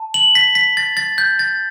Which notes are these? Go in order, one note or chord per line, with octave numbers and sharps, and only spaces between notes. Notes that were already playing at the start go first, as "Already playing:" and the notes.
Already playing: A5
F#7
B6
B6
A6
A6
G6
A6